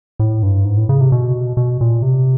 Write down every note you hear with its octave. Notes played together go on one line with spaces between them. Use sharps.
A2
G2
G#2
A2
C#3
C3
B2
B2
A#2
C3